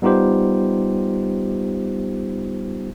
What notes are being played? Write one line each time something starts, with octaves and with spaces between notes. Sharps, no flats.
G3 B3 D#4 F4 G4 C5